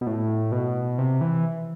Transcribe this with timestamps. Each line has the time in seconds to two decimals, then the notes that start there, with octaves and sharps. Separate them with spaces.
0.01 B2
0.07 A2
0.52 B2
0.98 C3
1.21 E3